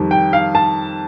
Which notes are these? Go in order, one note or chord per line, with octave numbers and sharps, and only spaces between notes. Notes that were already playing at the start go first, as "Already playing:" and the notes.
Already playing: F2 D#3 G3
G5
F5
A5